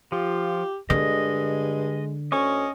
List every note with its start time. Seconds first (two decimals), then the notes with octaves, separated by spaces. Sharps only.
0.12 F3 F4 G4
0.90 G2 D3 G#3 D#5
2.32 D2 C#4 D#5 C#6